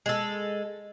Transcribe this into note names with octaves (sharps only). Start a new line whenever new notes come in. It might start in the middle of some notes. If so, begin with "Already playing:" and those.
G#3 A4